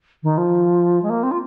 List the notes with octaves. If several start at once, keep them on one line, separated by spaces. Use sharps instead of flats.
D#3
F3
G#3
A#3
C4
F4